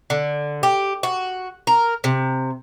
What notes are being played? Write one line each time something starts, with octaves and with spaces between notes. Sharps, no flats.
D3
G4
F#4
A#4
C3